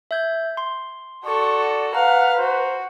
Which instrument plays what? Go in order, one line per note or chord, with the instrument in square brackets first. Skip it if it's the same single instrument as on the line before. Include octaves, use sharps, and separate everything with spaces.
[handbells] E5 G6 G#6
C6
[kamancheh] F#4 A4 [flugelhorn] D5 [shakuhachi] C#6
[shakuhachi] B4 [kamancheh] F5 [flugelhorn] F#5 [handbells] A#5
[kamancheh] F#4 [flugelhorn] C5